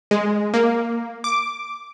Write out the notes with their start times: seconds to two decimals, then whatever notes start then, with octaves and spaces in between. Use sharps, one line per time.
0.11 G#3
0.54 A#3
1.24 D6